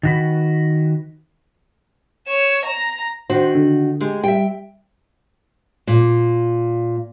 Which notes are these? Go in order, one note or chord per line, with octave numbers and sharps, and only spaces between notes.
D#3 F#4 B4
C#5 E7
A#5
D#3 D4 F#4 C5
D3
G#3 G4 G#4
G3 E5 G5
A#2